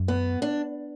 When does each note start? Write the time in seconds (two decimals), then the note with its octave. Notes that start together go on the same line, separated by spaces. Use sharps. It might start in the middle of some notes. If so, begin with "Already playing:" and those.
Already playing: F#2
0.08 B3
0.42 D4